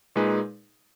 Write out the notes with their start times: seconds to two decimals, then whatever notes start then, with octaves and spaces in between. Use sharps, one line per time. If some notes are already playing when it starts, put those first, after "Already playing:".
0.16 A#2 G#3 D#4 G#4 B4